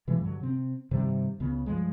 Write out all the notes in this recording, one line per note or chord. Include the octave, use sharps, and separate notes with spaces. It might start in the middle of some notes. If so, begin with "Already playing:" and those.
B2 E3 F3 G#3
G2 D3 F#3
C3 C4
G2 C3 D#3 G3
C#2 C#3 B3
G2 F3 G#3